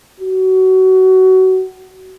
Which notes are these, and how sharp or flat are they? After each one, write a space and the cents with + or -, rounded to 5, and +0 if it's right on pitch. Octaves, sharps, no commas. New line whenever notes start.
F#4 +25